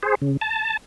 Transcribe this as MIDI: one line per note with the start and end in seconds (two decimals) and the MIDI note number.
0.03 0.15 68
0.03 0.15 72
0.22 0.37 49
0.41 0.77 81